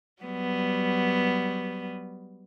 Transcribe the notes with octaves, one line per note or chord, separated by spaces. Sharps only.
F#3 G3 B3